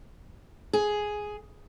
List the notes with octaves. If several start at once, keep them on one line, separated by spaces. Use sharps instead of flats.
G#4